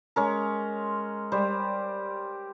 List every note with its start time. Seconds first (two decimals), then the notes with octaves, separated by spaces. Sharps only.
0.16 G#3 C#4 A#4
1.32 G3 C5